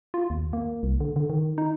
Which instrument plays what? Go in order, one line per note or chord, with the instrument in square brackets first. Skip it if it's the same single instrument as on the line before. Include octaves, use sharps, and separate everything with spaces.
[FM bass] F4
D#2
A#3
C2
D3
D3
D#3
D#4